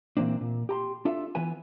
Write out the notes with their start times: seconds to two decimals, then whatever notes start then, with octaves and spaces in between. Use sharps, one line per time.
0.17 A#2 E3 A#3 C4 D4
0.41 A#2
0.69 G4 A#5 C6
1.05 D4 F4 A4 E5
1.35 E3 B3 B4 G#5